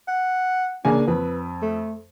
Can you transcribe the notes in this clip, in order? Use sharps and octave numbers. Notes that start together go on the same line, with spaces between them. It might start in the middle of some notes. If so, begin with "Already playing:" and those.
F#5
C#3 A#3 D4 G#5
F2 B4
A3